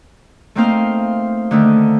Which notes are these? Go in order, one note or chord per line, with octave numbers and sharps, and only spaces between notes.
A3 A#3 C4 D#4 C5 F5
D3 D#3 A3